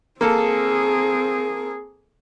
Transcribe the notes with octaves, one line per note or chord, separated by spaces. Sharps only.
A#3 C4 G#4 A4